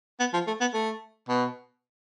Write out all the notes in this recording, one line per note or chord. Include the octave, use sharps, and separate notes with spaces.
B3
F3
A3
B3
A3
B2